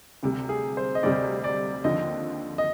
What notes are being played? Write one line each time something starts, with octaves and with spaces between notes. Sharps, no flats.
D2 C3 G3
G#4
C5
D#5
D2 C3 G3 D5
D5
D#2 D3 F3 C4 D#5
D#5